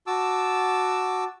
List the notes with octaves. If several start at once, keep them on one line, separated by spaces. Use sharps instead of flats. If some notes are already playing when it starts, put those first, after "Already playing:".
F#4 A5 D6 E6